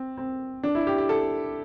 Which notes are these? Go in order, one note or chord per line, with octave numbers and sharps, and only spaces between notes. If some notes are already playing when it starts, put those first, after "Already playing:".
Already playing: C4
C4
D4
E4
G4
G4
A4